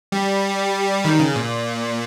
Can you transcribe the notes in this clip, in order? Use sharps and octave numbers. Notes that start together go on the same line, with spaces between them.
G3
D#3
C#3
A#2